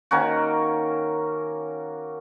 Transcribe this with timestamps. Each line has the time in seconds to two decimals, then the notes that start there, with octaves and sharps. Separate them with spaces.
0.11 D#3 A#3 C#4 F#4